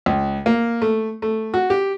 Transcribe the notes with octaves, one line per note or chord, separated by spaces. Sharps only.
C#2
A#3
A3
A3
F#4
G4